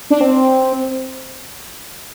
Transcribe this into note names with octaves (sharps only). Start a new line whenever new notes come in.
D4
C4